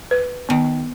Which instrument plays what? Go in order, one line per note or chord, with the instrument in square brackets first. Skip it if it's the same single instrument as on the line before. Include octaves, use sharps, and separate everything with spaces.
[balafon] B4
[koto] D#3 [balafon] B3